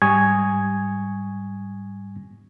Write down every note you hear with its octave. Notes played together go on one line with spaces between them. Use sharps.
G#2 G3 G#5 C#6 D#6 G#6